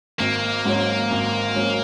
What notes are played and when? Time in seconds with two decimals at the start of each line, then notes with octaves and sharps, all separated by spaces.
0.20 G#1 A#3
0.65 G#2 F#3 C#4
1.11 G#1
1.56 G#2 F#3 C#4